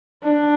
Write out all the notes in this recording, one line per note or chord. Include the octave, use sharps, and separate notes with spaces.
D4